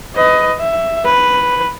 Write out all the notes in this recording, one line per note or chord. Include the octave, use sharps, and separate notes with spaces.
B4 D#5
E5
B4